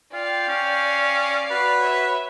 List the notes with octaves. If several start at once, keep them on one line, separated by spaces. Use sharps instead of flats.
F4 D5 F5 G5
C#4
F#4 B4
C#5 E5